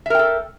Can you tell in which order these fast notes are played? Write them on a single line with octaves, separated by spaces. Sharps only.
E5 A#4 G5 A4